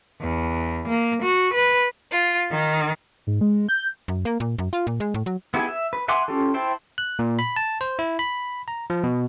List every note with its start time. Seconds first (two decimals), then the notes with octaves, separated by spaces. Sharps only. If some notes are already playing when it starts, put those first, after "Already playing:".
0.21 E2
0.88 A#3
1.23 F#4
1.54 B4
2.12 F4
2.51 D#3
3.27 G#2
3.41 G#3
3.69 G6
4.08 F#2
4.25 A#3
4.40 A#2
4.58 F#2
4.73 F4
4.87 A#2
5.00 G#3
5.14 A2
5.26 F#3
5.54 B3 E4 G4 G#4 G#5
5.69 E5
5.93 B4
6.08 E5 F#5 G#5 C6 D6
6.28 C#4 F4 G4 A4
6.54 E4 C5 E5 G5 A5
6.98 F#6
7.19 A#2
7.39 B5
7.56 A5
7.81 C5
7.99 E4
8.19 B5
8.68 A#5
8.90 F3
9.04 B2